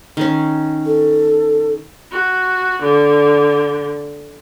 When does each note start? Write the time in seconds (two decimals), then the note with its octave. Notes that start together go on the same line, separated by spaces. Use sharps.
0.17 D#3 C#4
0.85 A4
2.12 F#4
2.83 D3